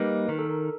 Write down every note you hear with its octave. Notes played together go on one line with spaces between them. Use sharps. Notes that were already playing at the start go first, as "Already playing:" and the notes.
Already playing: G3 A#3 D#4 B4
D#3 A#4
A4
A#4